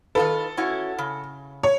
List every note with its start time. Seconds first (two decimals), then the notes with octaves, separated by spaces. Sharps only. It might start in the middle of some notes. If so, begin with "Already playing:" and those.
0.15 D#3 F4 A4 B4
0.57 C#4 E4 F#4
0.98 C#3
1.63 C#5